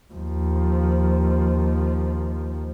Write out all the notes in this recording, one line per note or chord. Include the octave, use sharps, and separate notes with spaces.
D#2 F3